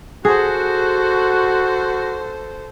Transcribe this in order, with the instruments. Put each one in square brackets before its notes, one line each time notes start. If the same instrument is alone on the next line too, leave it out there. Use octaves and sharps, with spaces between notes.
[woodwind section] F#4 [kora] G#4 [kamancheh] A4 C5